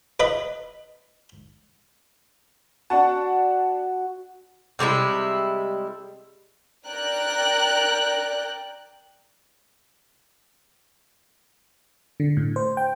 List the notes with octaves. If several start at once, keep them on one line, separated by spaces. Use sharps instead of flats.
B4 D#5 E5 B5
D4 F#4 F#5 A5
C3 G3 G#3 E4
A#4 D5 G5 F#6
D3
A2
C5
G5